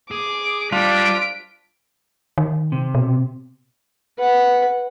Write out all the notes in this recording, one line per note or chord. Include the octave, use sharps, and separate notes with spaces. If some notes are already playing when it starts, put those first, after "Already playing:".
G#4 D6
G3 D4 F4 B6 D7
D#3
C3
B2
B4 F#5